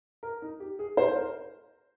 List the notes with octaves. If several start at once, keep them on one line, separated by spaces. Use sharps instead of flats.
A#4
D#4
G4
G#4
C5
A#4